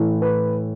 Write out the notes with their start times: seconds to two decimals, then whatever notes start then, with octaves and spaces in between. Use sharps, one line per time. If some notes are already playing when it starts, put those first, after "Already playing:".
Already playing: A2 E3 A3
0.22 B4